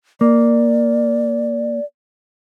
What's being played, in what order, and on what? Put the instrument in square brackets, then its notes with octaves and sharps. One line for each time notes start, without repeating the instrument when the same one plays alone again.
[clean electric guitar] A#3 [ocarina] D5